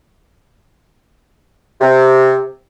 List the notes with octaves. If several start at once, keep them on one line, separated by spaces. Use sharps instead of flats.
C3